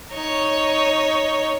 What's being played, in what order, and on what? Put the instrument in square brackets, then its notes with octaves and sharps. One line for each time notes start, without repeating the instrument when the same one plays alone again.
[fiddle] D#4 C#5